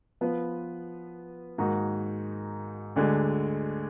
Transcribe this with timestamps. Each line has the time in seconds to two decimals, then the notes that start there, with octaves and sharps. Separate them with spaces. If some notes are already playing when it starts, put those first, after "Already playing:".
0.21 F3 B3 F4 B4
1.58 G#2 D#3 A#3 D#4 F#4
2.96 D2 D3 G#3